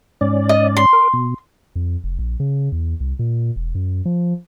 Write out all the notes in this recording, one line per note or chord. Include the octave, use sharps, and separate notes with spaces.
G#2 C#4 D5
D#5
C6
A#4
B2
F2
F1
A#1
C#3
E2
C2
A#2
E1
F#2
F3